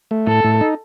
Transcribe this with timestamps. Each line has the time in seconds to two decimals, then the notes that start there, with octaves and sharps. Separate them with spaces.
0.11 A3
0.27 A2 A4
0.44 A2
0.61 D#4